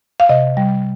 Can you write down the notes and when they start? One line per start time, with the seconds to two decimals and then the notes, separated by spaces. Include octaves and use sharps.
0.20 F5
0.29 C3 D#5
0.57 G3